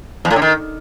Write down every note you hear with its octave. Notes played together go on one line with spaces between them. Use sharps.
E2
A2
D3
D#3